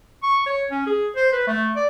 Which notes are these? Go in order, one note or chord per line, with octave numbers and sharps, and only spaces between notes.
C#6
C#5
C#4
G#4
C5
B4
A3
D5